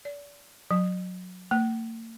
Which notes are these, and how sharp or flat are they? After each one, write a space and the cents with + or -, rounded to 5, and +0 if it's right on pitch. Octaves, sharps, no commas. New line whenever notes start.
D5 -35
F#3 -20
A#3 -45